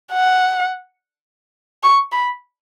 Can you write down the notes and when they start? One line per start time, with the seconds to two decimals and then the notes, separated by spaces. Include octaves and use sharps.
0.12 F#5
1.83 C#6
2.12 B5